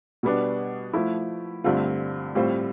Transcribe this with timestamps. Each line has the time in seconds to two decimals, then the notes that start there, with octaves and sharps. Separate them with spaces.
0.23 B2 G3 B3 D4
0.93 F3 A3 E4
1.64 G2 D3 A3 C4 F4
2.35 A2 G3 C4 F4 C5